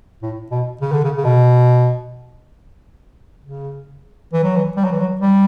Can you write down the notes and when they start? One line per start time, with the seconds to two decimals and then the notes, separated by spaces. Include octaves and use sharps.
0.22 A2
0.51 B2
0.81 C#3
0.92 D3
1.04 C#3
1.17 C#3
1.25 B2
3.45 C#3
4.33 E3
4.44 F#3
4.56 E3
4.77 G3
4.85 F#3
4.92 E3
5.00 F#3
5.21 G3